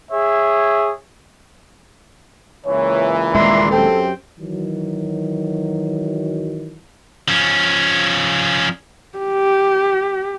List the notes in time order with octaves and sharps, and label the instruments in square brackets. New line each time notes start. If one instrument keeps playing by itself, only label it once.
[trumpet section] G#4 C#5 E5
[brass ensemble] C#2 A#2 E3 [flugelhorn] C#5
[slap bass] D#1 G#3 [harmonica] D4 A#5 C6 [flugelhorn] E5
[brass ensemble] F#2 G4 G5 [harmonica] C4 [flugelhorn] A4
[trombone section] D#3 E3 F#3
[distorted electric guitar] F3 C#4
[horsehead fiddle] G4